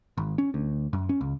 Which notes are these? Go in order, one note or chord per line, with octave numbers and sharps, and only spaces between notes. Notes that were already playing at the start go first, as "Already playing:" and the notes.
G#1
C#4
D2
F#2
C#4
C#2